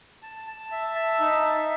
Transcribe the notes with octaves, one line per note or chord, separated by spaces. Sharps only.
A5
A5
E5
A5
D#4
E5